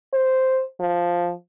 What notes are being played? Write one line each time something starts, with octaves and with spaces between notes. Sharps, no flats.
C5
F3